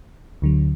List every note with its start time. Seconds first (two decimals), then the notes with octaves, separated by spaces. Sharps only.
0.42 D2 D3 F#3